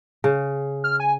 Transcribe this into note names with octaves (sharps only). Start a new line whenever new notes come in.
C#3
F6
G#5